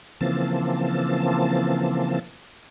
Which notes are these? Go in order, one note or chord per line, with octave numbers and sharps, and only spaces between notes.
C#3 E3 F3 A#3 C4 A5